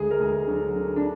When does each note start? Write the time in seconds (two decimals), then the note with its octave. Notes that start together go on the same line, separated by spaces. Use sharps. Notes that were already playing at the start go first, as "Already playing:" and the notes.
Already playing: D2 G#3 G#4
0.11 A#4
0.20 D2 G#3 G#4
0.47 D3 F#3 F#4
0.75 D3
0.96 D4